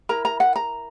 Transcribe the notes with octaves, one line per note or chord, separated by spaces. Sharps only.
E4 A#4 A#5
A#5
F#5
A#5